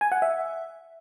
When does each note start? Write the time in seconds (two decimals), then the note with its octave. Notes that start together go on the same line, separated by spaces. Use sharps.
0.01 G#5
0.12 F#5
0.22 E5